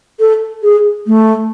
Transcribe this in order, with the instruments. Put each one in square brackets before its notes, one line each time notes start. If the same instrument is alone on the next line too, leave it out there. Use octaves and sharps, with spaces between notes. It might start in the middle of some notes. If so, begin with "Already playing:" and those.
[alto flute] A4
G#4
A3